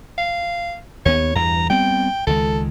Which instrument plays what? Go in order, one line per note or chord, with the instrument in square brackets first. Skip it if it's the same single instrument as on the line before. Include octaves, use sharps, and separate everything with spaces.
[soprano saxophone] F5
[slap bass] D#2 B3 [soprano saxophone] C#5
[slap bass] E2 G2 [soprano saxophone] A#5
[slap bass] G3 B3 C4 [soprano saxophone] G5
[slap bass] C#2 D#3 G#3 [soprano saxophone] A4